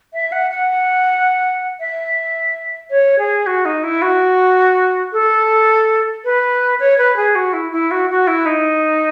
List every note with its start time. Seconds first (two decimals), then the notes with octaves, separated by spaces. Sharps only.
0.14 E5
0.32 F#5
0.51 F#5
1.80 E5
2.90 C#5
3.19 G#4
3.47 F#4
3.65 D#4
3.84 E4
4.02 F#4
5.13 A4
6.25 B4
6.80 C#5
6.98 B4
7.17 G#4
7.35 F#4
7.53 E4
7.72 E4
7.91 F#4
8.10 F#4
8.27 E4
8.46 D#4